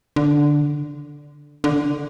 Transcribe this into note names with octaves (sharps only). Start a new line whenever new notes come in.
D3
D3